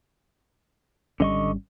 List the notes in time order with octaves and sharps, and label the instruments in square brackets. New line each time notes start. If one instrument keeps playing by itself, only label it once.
[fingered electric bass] G#1 G3 C#4 [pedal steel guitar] D3 D#5 C#6